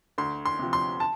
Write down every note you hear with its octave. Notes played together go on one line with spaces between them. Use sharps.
D2 C6
C6
C3 F3
C6
A5